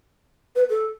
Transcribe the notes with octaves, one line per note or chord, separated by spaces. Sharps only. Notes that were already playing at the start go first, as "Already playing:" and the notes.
B4
A4